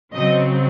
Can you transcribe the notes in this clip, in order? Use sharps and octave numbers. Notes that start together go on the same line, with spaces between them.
C#3 F#3 C4 D#5